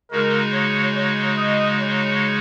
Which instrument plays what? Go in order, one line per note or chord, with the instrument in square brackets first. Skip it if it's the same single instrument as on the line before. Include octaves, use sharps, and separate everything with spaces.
[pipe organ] C#3 G#3 D#4 F#4 [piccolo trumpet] A#4
[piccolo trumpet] C#5
C#5
D#5
C#5